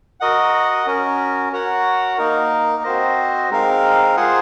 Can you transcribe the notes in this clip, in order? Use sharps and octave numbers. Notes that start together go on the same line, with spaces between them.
F#4 A#4 D#5 F#5
C#4 F#4 A#4
F#4 A#4 C#5 F#5
A#3 D#4 A#4
C4 F#4 C5 D#5
G#3 C4 D#4 A#4 F5
F4 G#4 C5 F#5